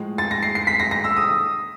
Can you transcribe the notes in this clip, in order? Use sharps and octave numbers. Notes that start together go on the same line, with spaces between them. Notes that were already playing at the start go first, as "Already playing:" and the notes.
Already playing: A2 F3 G#3
A6
A#6
C7
C7
B6
A#6
A#6
E6
D#6